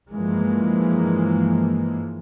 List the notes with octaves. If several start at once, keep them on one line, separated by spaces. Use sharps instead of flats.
G2 E3 F3 G#3 A#3